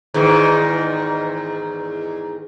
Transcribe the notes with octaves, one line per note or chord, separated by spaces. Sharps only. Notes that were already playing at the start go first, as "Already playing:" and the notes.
E2 G#2 D#3